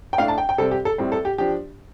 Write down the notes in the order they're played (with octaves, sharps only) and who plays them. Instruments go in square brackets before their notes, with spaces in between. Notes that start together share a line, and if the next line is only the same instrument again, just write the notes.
[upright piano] G5
A2 A3 D4 F5
A5
G5
G5
C3 G3 C4 A4
G4
A4
A2 G3 C4
A4
G4
F3 D4 G4